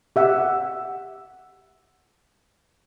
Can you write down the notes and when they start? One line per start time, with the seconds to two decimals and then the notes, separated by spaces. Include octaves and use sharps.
0.16 G4 E5 F#5